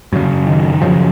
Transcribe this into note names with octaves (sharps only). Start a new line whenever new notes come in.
F#2 C#3
D#3
F#2 C#3 F3